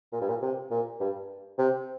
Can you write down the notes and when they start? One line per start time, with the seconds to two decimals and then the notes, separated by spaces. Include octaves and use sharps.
0.12 A#2
0.21 G2
0.29 A#2
0.42 C3
0.71 A#2
1.00 G2
1.59 C3